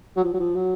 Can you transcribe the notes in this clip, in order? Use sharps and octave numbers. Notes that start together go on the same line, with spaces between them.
F#3
F3
F#3
F3
F#3